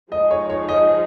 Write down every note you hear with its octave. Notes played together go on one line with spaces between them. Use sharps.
F3 G#3 D#4 G#4 D#5
C#5
C#5
D#5